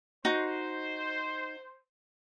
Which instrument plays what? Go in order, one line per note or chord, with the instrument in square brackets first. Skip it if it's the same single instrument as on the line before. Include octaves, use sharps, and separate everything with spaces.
[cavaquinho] D#4 F#4 [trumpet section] C5